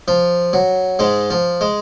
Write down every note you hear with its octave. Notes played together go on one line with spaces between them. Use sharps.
F3
F#3
G#2 G#3
F3
G#3